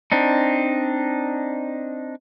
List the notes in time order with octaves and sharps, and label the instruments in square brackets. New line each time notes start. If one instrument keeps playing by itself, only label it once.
[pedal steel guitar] C4 D4 D#4